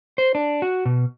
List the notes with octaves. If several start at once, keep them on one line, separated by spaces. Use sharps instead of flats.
C5
D4
F#4
B2